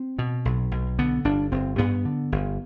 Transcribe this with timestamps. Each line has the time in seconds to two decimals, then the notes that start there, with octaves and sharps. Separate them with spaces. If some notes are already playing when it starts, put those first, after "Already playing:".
Already playing: C4
0.19 B2
0.45 B1
0.71 B1
0.99 D3 B3
1.25 G1 D4
1.52 G1 C4
1.78 G2 B3
2.05 D3
2.32 G1